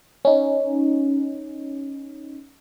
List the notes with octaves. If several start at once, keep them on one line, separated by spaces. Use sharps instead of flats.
C#4 D#4